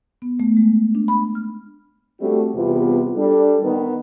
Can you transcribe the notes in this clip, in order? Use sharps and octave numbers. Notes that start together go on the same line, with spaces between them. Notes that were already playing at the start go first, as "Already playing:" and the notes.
B3
A3
G#3
D4
B5
F6
G3 A3 C4 D4 F#4 A4
E2 C3 G3 B3 F4
G3 D4 A4
D#3 B3